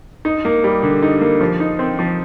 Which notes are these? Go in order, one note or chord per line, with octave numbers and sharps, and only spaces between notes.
D#4
A#3
G3
D3
D#4
A#3
F3
D#4
C4
F3